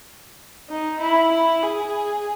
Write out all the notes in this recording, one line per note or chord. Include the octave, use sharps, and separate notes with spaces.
D#4
E4
E4
G#4